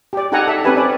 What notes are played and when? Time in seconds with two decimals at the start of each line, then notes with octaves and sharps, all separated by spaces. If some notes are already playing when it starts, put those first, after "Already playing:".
0.13 G4 D5
0.32 D#4 G4 A4 F#5 G#5 A#5
0.48 A4 E5
0.64 C4 C#4 G4 B4 G#5 A5
0.77 D5